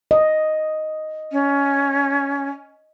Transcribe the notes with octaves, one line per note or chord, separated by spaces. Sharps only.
D#5
C#4